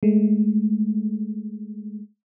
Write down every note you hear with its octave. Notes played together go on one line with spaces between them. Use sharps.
G#3 A3